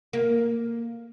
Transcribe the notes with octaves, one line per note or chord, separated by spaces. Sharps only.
A#3